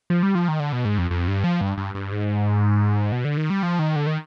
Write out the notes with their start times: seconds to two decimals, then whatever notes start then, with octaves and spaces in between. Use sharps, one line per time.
0.10 F3
0.23 G3
0.35 F3
0.48 D#3
0.60 D3
0.73 B2
0.85 G#2
0.98 F2
1.11 F2
1.28 G2
1.44 F3
1.61 G2
1.77 G2
1.95 G2
2.12 G#2
3.12 B2
3.25 D3
3.37 D#3
3.50 G3
3.63 F3
3.79 D#3
3.96 D3
4.07 D#3